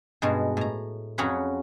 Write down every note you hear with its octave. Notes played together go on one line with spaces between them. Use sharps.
G2 B2 G#3
A2 A#5
F2 F#3 C#4 G#4 F#5 B5